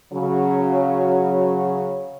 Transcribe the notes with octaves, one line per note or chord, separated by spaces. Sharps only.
C#3 F#3